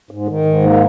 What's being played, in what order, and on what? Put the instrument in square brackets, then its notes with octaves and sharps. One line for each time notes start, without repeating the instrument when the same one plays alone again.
[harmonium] G#2
D#3
G#2
A#3